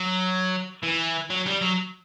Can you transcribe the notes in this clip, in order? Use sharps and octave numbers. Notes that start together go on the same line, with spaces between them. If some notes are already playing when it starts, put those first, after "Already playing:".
Already playing: F#3
E3
F#3
G3
F#3